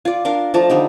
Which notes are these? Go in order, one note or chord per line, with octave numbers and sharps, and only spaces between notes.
F4 D5
D4 A#4 F5
F3 A3 A5 A#5
D3 G3 D#4